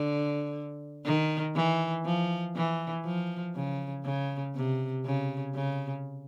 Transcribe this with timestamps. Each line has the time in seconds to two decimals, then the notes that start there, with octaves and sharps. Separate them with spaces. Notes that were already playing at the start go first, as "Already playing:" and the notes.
Already playing: D3
1.06 D#3
1.56 E3
2.06 F3
2.56 E3
3.06 F3
3.55 C#3
4.05 C#3
4.55 C3
5.06 C#3
5.56 C#3